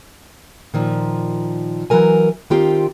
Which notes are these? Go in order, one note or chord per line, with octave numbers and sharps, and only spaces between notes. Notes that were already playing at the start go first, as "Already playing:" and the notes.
A#2 D#3 F3
E3 F#3 A#4 G#5
D#3 C4 F4 G4 G5